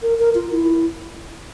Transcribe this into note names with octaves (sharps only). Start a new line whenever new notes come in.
A#4
A#4
F4
E4